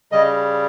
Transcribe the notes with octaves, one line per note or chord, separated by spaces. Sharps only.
C#3 G3 D#5